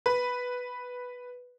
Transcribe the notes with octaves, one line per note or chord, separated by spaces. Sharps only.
B4